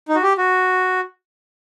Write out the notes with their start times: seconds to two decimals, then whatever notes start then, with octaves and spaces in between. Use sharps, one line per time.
0.09 D#4
0.15 F#4
0.23 G4
0.38 F#4